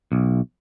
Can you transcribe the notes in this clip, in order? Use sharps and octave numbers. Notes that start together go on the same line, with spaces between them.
B1